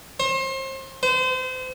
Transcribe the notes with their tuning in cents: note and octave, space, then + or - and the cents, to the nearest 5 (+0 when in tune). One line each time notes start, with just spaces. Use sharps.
C5 +35
C5 -35